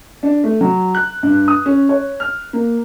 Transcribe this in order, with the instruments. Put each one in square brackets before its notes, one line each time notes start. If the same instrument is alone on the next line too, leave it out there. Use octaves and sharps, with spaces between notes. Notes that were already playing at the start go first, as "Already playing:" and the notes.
[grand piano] D4
A3
F#3
F#6
G2
D#6
C#4
C#5
F6
A#3